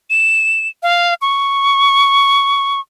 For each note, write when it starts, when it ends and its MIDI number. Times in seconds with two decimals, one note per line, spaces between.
0.10 0.68 100
0.83 1.14 77
1.22 2.80 85